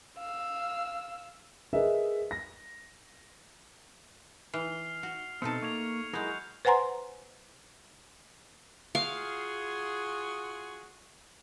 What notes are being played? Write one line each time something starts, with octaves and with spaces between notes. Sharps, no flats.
F5 E6
G#4 A#4 B4 D#5 E5
A#6
E3 F6 C7 F7
F#4
B2 A3 C4 D#4 A4 C#7
A#3 C#6 G#6 F7
F#3 G#3 E4 G#4 A#4 F#6 G6
B4 C5 F#5 G#5 A#5 C6
F4 F#4 G#4 F5